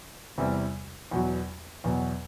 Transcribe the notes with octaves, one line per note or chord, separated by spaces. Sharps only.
E2 C3 E3 G3
E2 B2 F#3
E2 B2 F#3